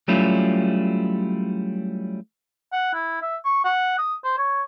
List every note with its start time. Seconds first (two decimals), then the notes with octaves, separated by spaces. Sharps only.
0.08 F#3 G3 A3 C#4 E4 F4
2.73 F#5
2.94 E4
3.22 E5
3.45 C#6
3.65 F#5
3.98 D#6
4.24 C5
4.38 C#5